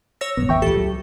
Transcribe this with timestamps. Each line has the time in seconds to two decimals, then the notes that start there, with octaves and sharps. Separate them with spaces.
0.21 C#5 E6 A#6
0.37 A#1 F#2 B3
0.49 A1 E2 E5 G5 C#6
0.62 C#2 A2 G4 A4
0.77 F#3